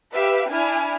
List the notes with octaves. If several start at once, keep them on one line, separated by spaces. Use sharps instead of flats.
G4 B4 E5 F5
D4 E4 G#5 F6